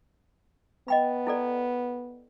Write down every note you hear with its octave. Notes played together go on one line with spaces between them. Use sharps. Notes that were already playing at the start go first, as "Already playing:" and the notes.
B3 D#5 G5 B5
E4 A4 D5